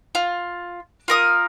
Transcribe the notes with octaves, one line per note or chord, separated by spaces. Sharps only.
F4
F4 A#4 D#6